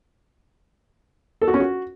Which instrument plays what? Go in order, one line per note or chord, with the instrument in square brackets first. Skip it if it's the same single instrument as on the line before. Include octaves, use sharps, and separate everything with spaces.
[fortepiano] A4
F#4
C#4
F#4